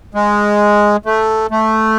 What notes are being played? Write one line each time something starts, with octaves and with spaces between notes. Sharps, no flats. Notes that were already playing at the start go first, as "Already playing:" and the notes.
G#3
A3
A3